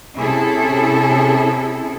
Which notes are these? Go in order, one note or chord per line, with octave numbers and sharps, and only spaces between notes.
C3 C#4 E4 G#4 A4